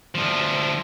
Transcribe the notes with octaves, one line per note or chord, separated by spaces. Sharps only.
D2 F3